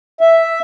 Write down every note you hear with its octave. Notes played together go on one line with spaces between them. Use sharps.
E5